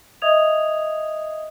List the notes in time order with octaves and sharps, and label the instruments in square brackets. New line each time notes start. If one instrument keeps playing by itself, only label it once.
[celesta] D#5 E5 D#6 G#6 F7